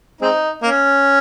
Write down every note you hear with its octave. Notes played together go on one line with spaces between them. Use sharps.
G#3 C4 D#4
A#3 C#4